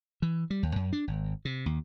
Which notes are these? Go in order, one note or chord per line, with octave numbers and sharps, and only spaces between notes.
E3
G3
D#2
F#2
D4
G#1
C3
D#2